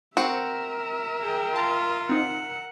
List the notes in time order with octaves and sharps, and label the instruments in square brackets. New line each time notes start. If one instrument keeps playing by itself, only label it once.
[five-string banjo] C4 F#4 [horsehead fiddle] A#4 E5 [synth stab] C5 C#7
[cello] G#4 G5
[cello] F4 [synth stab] A5 A#5
[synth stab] C4 D#4 [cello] F#5